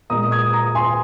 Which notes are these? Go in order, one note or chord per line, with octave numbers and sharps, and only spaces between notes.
A#2 G#3 A#5 D#6
D#6 G#6
A#5 D#6
G#5 C6